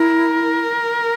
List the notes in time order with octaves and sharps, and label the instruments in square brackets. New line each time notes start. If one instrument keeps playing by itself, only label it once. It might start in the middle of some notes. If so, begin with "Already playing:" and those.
Already playing: [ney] E4 [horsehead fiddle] A#4